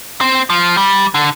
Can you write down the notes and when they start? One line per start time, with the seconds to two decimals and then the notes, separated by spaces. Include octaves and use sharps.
0.21 C4
0.50 F3
0.77 G3
1.14 D3